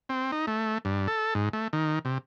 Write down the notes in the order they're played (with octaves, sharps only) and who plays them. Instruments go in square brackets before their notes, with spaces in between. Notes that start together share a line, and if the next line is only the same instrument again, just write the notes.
[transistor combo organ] C4
D#4
A3
G2
A4
G#2
A3
D#3
C3